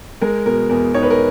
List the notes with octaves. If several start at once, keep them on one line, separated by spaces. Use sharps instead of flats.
G#3 A#4
B2 A#4
E2 A#4
D#4 C#5
B4
A#4